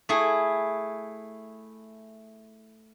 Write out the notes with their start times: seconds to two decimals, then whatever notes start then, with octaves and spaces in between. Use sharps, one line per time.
0.09 A3 E4 G#4